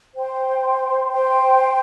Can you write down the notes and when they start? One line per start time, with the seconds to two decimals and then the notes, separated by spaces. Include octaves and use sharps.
0.15 C5 G5 C6
1.10 C5 G5 C6